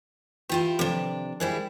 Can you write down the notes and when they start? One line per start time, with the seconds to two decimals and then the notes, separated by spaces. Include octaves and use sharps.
0.49 E3 E4 F4 G4 G5
0.79 C3 D#3 F3 D4 A4
1.40 G3 E4 G#4 A#4 C5